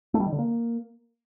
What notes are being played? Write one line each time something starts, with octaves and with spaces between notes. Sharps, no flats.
A3
G3
D#3
D3
A#3